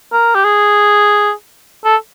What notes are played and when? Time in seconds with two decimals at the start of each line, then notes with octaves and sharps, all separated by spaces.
0.12 A#4
0.35 G4
0.44 G#4
1.85 A4